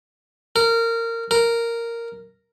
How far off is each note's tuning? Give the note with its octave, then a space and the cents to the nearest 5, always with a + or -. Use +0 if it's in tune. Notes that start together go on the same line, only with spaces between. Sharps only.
A#4 -20
A#4 -5